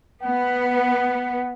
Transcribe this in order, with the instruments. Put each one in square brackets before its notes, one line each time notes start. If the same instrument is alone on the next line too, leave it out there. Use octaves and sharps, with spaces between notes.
[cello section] B3 [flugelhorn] F#5